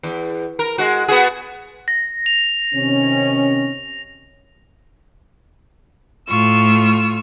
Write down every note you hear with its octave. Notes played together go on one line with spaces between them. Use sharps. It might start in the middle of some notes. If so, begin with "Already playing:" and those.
E2
A#4
G#3 F#4
B3 F#4 G#4
A#6
F7
C3 D#3 C#4
A2 F4 C#6 E6